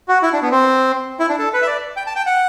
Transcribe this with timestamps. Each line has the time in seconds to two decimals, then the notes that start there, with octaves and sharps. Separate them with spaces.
0.08 F#4
0.23 E4
0.33 D4
0.42 B3
0.51 C4
1.20 E4
1.29 D4
1.39 A4
1.54 B4
1.62 E5
1.67 D5
1.97 G5
2.07 A5
2.16 G5
2.26 F#5